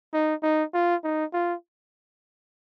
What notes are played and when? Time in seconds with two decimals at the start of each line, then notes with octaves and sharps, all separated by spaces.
0.13 D#4
0.43 D#4
0.74 F4
1.04 D#4
1.33 F4